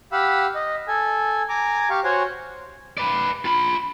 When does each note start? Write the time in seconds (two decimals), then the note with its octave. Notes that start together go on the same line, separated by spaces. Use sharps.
0.12 G4 F5 F#5 B5 E6
0.55 D#5
0.88 A4 G#5
1.49 G#5 A#5 D6
1.90 G4 F5 C#6
2.04 F#4 C5 C#5 F#5 G#5
2.98 B4 D5
3.45 F4 B5